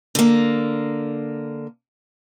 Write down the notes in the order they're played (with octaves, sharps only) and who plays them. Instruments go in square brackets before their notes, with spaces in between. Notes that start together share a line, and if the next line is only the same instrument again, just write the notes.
[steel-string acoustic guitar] D3 A#3